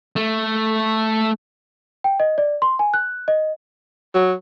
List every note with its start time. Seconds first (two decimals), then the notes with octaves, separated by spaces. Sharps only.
0.16 A3
2.04 G5
2.20 D#5
2.38 D5
2.62 C6
2.79 G#5
2.94 F#6
3.28 D#5
4.15 F#3